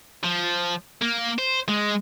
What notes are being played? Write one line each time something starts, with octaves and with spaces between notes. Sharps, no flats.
F3
A#3
C5
G#3